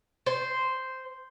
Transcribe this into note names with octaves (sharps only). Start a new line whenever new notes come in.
C5